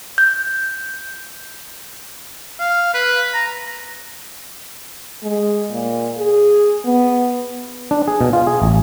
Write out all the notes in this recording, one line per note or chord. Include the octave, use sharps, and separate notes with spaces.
G6
F5
B4
A#5
G#3
A#2
G#4
B3
D4
G#4
B2
F4
G#4
A1